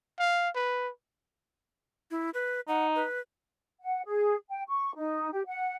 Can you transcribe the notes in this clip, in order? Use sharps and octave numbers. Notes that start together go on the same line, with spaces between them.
F5
B4
E4
B4
D#4 F#5
B4
F#5
G#4
G5
C#6
D#4
G4
F#5